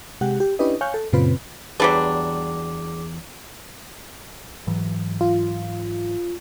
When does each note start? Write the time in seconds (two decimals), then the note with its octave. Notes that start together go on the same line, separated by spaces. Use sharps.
0.21 C3 G#3 G4 F#5
0.40 G4
0.59 C#4 D4 E4 G4 B4 D#5
0.81 C#5 F5 G#5 C#6 F#6 G6
0.94 A4
1.13 F#2 A#2 C#3 C4 F4 B4
1.80 E2 F#3 G3 D4 G#4 B4 D6
4.67 G#2 E3 F#3
5.21 F4